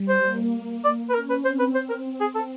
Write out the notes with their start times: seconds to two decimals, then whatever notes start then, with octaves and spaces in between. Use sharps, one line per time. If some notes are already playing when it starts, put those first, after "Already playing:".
Already playing: G3
0.09 C5
0.24 A#3
0.85 D5
1.10 B4
1.14 C#4 A#4
1.30 B4
1.45 C4 C5
1.59 B4
1.75 C5
1.89 A#4
2.06 C4
2.21 G#4
2.35 A4